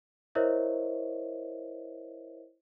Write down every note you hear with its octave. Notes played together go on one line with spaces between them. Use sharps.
E4 A#4 C5 C#5 D#5 E5